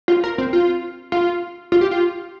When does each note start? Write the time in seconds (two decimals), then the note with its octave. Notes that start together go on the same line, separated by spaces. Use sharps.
0.08 F4
0.24 A#4
0.38 C4
0.53 F4
1.12 F4
1.72 F4
1.81 G4
1.91 F4